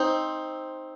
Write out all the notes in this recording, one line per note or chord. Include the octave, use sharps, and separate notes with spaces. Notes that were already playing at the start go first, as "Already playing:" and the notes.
Already playing: C4 D#4